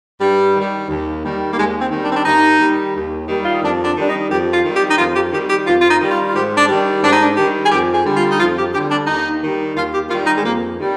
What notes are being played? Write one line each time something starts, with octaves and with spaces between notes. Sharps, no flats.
G2 G3
D#3 G3
D#2
D#3 G3
A#3
D#2 G#3
C4
D#3 G3
D4
C4
D4
D#2 D#4
D#3 G3
D#2
D#3 G3
F4
D#4
F2 D4
D4
D#3 G3 D4
D#4
F2 G4
F4
D#3 G3
G4
D#4
F2 F4
G4
D#3 G3 G4
G4
F2 F4
F4
D#4
D#3 G3
F4
F4
G#2 G4
D4
D#3 G3
G#2 D4
D#4
D4
D#3 G3 G4
G#4
F2 G4
G#4
D3 G3
F4
D#4
F2 F4
G4
D3 G3 G4
D4
D#2 D#4
D#3 G3
D#2 F4
G4
D#3 G3 F4
D#4
G#3
F2 A#3
D#3 G3